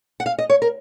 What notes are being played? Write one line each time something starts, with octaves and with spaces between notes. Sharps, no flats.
F#5
F5
D#5
C#5
A#4